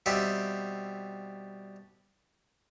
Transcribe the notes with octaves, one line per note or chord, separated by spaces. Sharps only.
B2 G3 C4 E5